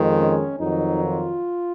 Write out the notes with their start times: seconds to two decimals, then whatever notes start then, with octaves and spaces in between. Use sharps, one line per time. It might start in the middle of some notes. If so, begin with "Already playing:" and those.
Already playing: F2 D#3 G#3
0.17 C#4
0.60 F2 D#3 F#3 D#4
1.04 F4